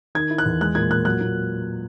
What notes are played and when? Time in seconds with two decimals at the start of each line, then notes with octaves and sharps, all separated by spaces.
0.15 D#3 G#6
0.30 E4
0.38 F#6
0.46 E2
0.61 G#3 F#6
0.75 A#2 G#6
0.91 A#2 F#6
1.05 F#3 F#6
1.21 A#2